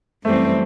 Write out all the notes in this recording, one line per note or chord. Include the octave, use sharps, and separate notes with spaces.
F#2 E3 G3 A3 C4